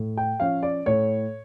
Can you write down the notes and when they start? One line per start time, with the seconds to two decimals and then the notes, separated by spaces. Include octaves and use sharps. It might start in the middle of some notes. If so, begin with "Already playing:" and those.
Already playing: A2
0.17 G5
0.40 F3 C#4 F5
0.63 D5
0.86 A2 C#5